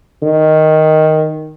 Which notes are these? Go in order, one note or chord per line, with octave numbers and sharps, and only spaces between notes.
D#3